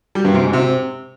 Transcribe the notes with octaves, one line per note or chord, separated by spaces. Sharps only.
G3
G2
C3
G#2
C3